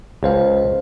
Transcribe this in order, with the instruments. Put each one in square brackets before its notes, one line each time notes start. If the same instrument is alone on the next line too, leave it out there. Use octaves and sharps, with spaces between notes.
[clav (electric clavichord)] C#2 [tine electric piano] G#4 C5 F5